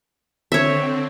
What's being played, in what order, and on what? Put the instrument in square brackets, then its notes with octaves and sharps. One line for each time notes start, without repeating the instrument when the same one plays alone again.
[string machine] D3 C4 [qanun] C#5 E5